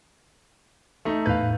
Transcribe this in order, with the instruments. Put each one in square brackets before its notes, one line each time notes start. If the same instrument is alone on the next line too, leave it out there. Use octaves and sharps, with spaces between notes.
[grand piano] A3 D#4
[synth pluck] E2 A2 G6 [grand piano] B4 F5